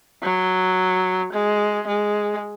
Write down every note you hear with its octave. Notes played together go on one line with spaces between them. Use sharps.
F#3
G#3
G#3